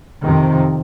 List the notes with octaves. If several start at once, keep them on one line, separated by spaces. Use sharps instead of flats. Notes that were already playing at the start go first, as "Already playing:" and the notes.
F2 C3 D#3